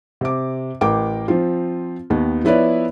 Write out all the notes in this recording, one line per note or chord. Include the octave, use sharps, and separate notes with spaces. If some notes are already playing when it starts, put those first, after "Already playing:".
C3 D6
A1 A#4 G5 D6
F3 C4 F4
D#2 D#3 B3
F3 B3 E4 B4 C#5 D5